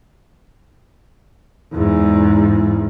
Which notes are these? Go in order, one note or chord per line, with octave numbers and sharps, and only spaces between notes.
E2 G#2